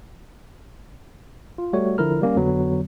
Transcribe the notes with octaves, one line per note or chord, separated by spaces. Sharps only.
F4
G3 A3 F#4 C#5
D3 F3 E4 A#4 A#5 F6
G3 A#3 C#4
F2 D3 F#3 B3